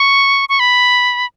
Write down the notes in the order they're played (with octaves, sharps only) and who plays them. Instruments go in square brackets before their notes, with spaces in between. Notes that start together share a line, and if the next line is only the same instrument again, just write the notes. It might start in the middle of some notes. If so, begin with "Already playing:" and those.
Already playing: [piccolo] C#6
C#6
B5